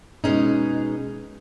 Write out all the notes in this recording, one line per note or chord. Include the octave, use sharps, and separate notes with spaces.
B2 G#3 C#4 D#4